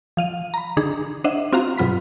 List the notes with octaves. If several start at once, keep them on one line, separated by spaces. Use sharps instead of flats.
F3 F5 D#7
A#5 B5
D3 D4 D#4 G#4
D4 C5 D#5 E5 F#5
C4 F4 F#4 F5 A#5 C6
G2 B2 F#3 F4 B5 B6